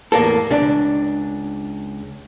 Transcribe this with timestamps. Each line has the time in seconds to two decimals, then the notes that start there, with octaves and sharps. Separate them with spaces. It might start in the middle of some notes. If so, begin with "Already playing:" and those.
0.12 E2 A2 A#3 A4
0.51 C#2 D4